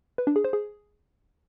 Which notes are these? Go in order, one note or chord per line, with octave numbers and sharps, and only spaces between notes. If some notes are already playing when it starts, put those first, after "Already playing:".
B4
D4
G#4
C5
G#4